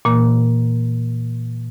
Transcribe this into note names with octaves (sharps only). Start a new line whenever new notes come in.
A#2 E3 A#3